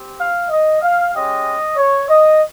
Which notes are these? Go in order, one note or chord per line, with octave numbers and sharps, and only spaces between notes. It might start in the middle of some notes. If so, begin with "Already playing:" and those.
Already playing: C4 G4
F5
D#5
F5
G#3 C#4 G4 D#5
C#5
D#5